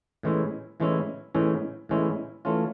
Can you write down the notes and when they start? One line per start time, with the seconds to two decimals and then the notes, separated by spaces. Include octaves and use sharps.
0.23 A2 E3 G#3 C#4 E4
0.80 A2 E3 G#3 C#4 E4
1.35 A2 E3 G#3 C#4 E4
1.89 A2 E3 G#3 C#4 E4
2.45 E3 A3 C#4 F4